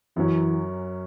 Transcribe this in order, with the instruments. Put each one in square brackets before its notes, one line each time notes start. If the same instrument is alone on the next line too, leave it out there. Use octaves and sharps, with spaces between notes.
[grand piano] F#2 F#3 C#4 [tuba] E3